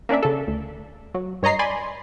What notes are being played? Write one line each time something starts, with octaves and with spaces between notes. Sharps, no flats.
A#3 C#4 D4 D5 E5
C#3 A4
D2
F#3
G2 C#5 D#5 A#5 C7
D5 G#5 B5 C6